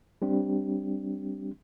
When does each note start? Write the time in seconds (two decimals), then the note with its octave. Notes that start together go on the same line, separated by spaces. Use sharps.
0.22 G3 C4 D4 G4